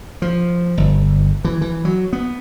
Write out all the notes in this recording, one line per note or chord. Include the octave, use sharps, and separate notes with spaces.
F3
G1
E3
E3
F#3
B3